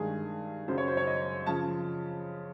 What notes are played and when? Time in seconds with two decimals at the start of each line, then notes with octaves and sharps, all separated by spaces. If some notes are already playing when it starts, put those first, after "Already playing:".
Already playing: G2 D#3 G#3 G#4
0.68 F#2 C#3 F#3 C5
0.78 C#5
0.88 C5
0.97 C#5
1.07 D#5
1.46 C#3 F3 A5